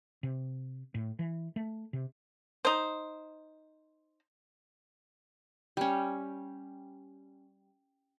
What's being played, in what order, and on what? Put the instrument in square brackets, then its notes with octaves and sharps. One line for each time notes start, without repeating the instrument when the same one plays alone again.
[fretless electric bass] C3
A2
E3
A3
C3
[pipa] D#4 C5
[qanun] G3 C#4